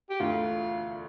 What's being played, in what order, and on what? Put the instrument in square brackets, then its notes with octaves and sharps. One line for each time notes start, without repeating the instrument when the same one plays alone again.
[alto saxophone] G4
[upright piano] E1 D2 D3 A3 E4 [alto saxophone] F4